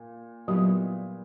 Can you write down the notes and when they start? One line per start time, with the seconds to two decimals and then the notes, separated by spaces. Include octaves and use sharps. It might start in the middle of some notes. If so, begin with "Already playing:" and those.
Already playing: A#2
0.48 A#2 F#3 G3 B3 E4